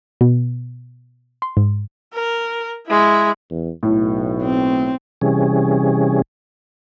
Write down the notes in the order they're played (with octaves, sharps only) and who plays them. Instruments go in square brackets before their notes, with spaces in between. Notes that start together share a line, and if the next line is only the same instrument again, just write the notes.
[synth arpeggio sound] B2
C6
G#2
[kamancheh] A#4
G#3 E4
[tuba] E2
[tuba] B1 [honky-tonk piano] A2
[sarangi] C4
[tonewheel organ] C3 E3 G3 C#4 G#4